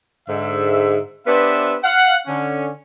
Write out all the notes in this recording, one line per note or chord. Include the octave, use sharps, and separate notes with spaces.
G#2 D3 E5
B3 D4 G4 B4 C5 E5
F5 F#5
D3 C#4